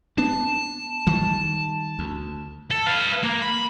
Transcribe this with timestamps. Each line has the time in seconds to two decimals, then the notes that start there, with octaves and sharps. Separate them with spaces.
0.18 B3 D4 A5
1.07 D#3 G3
1.99 D2
2.71 A4
2.87 B4 F5
3.23 A#3
3.42 B5